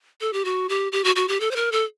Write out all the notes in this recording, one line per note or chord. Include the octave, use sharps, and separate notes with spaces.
A4
G4
F#4
G4
G4
F#4
F#4
G4
A4
C5
A#4
A4